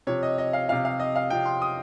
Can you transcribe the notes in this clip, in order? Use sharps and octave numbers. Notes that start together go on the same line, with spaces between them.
C3 F3 C#5
D#5
D#5
F5
C3 F3 F5
F5
D#5
F5
C3 F3 G5
C6
D#6